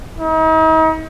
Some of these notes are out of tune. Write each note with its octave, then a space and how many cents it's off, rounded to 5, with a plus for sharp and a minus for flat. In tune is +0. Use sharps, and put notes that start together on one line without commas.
D#4 +40